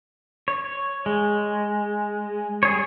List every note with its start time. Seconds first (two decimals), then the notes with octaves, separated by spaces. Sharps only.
0.48 C#5
1.06 G#3
2.63 G3 G#4 C#5